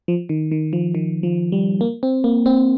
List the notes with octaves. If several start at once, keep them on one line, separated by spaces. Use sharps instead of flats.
F3
D#3
D#3
F3
D#3
F3
G3
A#3
C4
A#3
C4